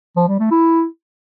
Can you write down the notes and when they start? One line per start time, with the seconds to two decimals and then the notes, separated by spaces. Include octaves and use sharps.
0.16 F3
0.28 G3
0.40 A3
0.51 E4